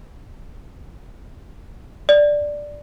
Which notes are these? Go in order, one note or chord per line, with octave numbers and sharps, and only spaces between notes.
D5